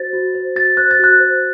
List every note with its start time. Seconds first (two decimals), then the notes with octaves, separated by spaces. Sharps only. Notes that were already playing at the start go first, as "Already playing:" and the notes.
Already playing: F#4 C5 A6
0.13 F#4
0.34 C5
0.56 F#4 A6
0.77 C5 F#6
0.91 A6
0.99 F#4 F#6
1.20 C5